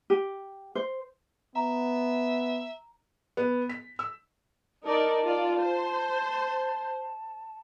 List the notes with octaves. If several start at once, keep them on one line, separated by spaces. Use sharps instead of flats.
G4
C5
B3 E5 A#5
B3
B6
E6
D#4 A#4 D5 A5
F4 D5
C5